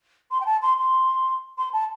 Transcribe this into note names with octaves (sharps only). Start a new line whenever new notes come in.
C6
G5
A5
C6
C6
C6
A5